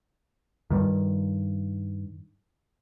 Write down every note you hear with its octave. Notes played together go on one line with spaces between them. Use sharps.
G2 D#3